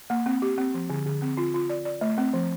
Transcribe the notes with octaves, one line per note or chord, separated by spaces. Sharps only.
A#3
C4
G4
C4
F3
D3
D3
C4
F4
F4
D5
D5
A3
C4
F3